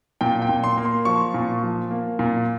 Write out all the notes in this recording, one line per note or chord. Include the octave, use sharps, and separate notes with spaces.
A#2 G5
G5
A#2
C6
A#3
C6
F3 C#6
A#2
F3
A#3
A#2